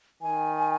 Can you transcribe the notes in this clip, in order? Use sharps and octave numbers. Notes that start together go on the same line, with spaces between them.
D#3 G#5